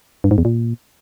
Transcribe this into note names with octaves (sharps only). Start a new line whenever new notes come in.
G2
G#2
E2
A#2